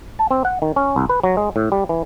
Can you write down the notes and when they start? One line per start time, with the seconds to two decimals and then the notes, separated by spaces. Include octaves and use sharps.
0.19 A5
0.31 C4
0.45 F#5
0.62 D#3
0.76 C#4
0.96 C2
1.09 B4
1.23 F#3
1.37 G#3
1.56 A2
1.72 G3
1.89 E3